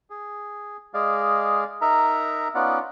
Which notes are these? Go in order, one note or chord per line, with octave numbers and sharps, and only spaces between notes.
G#4
G#3 G#4 D5 D#5 F5
D#4 A#4 E5 A#5
B3 C#4 D#4 F4 D5 F#5